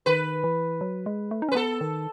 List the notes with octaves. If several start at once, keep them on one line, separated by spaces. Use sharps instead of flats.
D#3 B4
E3
F#3
G#3
A3
D#4
C#4
B4
B3 A4
D#3